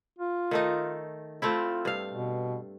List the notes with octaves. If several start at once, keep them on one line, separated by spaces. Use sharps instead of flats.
F4
D#3 A3 D#4
A3 C4 E4 F4
G2 F5
B2